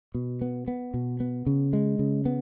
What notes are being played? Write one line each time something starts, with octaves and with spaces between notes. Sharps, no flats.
B2
B3
B3
B2
B3
C#3
G#3
C#3
B3